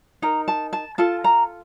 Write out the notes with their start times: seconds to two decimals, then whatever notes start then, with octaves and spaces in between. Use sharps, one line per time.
0.22 D#4 A#4 A#5
0.48 A5
0.73 A5
0.98 F4 A4 A5
1.24 A#5